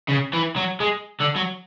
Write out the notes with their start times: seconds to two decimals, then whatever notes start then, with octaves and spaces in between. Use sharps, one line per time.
0.09 C#3
0.34 E3
0.56 F#3
0.80 G#3
1.21 D3
1.36 F#3